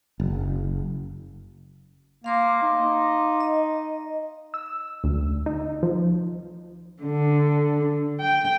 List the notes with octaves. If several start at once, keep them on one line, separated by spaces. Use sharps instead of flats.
F#1
A#3 F5 C6 D6
D#4
D#5
E6
D2
D#4
F3
D3
G5